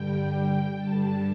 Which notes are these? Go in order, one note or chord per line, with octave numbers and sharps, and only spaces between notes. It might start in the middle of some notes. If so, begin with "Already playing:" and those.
Already playing: G2 D3 G3 G5
G5
G2 D3 G3 A5